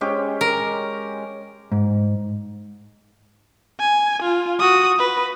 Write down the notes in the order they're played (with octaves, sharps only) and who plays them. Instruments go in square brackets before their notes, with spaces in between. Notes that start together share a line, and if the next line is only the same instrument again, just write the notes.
[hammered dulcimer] G#3 C#4 G4
[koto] A#4
[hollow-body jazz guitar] G#2
[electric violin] G#5
F4
F#4 D#6
B4